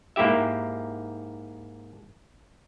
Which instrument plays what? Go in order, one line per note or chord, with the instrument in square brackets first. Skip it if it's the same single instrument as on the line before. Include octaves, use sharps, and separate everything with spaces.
[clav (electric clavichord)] G#2 A#3 E4 G4 E5